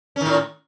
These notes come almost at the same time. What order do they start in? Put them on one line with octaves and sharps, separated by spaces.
C#4 D#3 A2